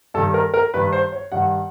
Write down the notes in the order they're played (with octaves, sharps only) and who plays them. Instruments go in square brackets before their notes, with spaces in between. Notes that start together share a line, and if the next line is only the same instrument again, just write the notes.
[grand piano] G2 D#3 A4
A#4
A#4
G2 D#3 B4
C5
C#5
G2 D#3 F#5